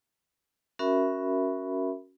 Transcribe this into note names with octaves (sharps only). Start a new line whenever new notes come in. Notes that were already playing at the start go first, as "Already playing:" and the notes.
C#4 F#4 A#4 E5 B5